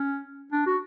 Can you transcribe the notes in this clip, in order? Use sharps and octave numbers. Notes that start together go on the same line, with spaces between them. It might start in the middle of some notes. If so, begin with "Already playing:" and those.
Already playing: C#4
D4
F#4